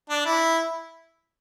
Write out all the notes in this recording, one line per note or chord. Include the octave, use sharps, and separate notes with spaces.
D4
E4